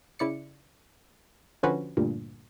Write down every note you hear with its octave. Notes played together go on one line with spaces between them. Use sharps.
C#3 E4 D5 C#7
D3 F3 C#4 F#4 B4 C5
D2 G2 A#2